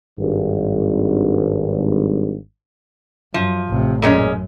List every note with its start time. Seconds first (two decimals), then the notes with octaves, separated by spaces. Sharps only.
0.19 G#1 G2
3.34 F#2 F3
3.69 A1 C3
4.02 F#2 A#2 G#3 C#4